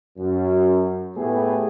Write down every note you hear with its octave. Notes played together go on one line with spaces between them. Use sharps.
F#2
A2 A3 B3 G4 G#4